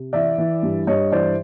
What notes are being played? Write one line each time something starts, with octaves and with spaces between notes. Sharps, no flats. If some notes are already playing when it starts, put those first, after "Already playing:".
Already playing: C3
E3 D5 E5
E3
G2
G2 C#5 D#5
E3 C5 D5